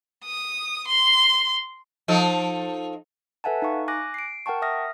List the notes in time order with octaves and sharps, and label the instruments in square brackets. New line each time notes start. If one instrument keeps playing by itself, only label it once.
[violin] D#6
C6
[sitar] F3 D#4 A4
[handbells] A4 B4 E5 F#5 G#5 A5
D#4 F5 C#6
G#5 D6 F#6 A#6
C7 D7
A#4 F#5 G5 A5 C#6
E5 D#6 F6 A#6